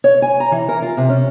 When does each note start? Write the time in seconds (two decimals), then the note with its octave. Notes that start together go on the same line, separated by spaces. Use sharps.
0.04 C#5
0.22 G#5
0.40 A#5
0.52 E3
0.69 A#4
0.82 F4
0.97 C3
1.09 C#4